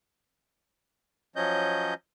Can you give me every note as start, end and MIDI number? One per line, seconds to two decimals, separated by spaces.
1.36 1.94 53
1.36 1.94 54
1.36 1.94 61
1.36 1.94 75
1.36 1.94 91